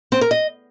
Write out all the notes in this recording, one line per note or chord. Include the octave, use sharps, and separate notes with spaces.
C4
A#4
D#5